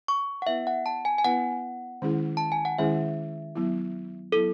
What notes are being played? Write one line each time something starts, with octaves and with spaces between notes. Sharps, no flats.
C#6
F#5
B3 E4 B4 E5
F#5
A5
G#5
G#5
B3 E4 B4 F#5
D#3 G#3 C#4 E4 G#4
A5
G#5
F#5
D#3 G#3 C#4 E4 G#4 E5
F#3 B3 E4
F#3 B3 E4 A4